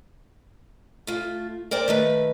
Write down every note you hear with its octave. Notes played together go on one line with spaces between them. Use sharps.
A3 F4
A#4 C5 D5 G5
D#3 A3 B4